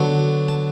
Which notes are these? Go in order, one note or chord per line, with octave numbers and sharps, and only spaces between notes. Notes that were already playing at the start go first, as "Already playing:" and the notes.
Already playing: D3 F#3 B3 D4
A5